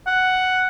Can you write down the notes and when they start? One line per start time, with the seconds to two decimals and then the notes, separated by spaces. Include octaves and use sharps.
0.07 F#5